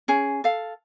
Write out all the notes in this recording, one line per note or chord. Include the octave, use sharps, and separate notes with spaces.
C#4 G#4
A4 F5